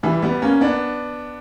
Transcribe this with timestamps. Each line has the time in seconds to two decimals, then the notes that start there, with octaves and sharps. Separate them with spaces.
0.03 E3 G3
0.22 G3 B3
0.42 A#3 C#4
0.61 B3 D4